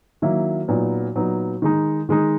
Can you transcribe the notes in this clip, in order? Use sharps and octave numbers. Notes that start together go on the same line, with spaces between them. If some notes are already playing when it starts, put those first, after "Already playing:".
D#3 F#3 A#3 E4
A#2 F#3 B3 D#4
A#2 F#3 B3 D#4
D#3 G#3 D#4
D#3 G#3 D#4